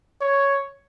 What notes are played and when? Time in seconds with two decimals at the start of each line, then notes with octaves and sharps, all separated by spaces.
0.21 C#5